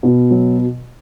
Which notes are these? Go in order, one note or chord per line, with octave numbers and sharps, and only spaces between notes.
B2
F#3